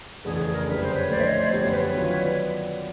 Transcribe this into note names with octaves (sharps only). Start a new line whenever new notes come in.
F2 C#3 E3 A3 D4 G#4
A4
G#4
A#4
F#2 D3 G3 B4
C5
B4 C#5
A2 F3 A3 C5 D5
E5
C#5 D#5
C5 D5
F#2 D3 G3 B3 C#5
C5
B4 C#5
D#3 F#3 B3 D4 F4